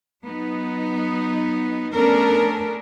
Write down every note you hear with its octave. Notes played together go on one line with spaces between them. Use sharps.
F#3 B3 D#4
A3 B3 C#4 D4 A4 A#4